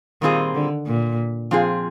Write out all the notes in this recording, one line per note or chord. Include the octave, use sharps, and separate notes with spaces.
A#2 D#3 G3 C4 F4 G#4
D3
A#2
F3 C4 F4 G#4